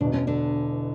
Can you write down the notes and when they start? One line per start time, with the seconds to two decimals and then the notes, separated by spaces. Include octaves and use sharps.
0.01 E1 E2 B2 D4
0.14 C#4
0.27 D3 D4